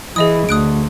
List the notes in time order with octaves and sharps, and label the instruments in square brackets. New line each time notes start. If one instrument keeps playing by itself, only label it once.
[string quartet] E3 [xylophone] G#4 D#5 D#6
[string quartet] D2 [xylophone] D#6 F#6 D7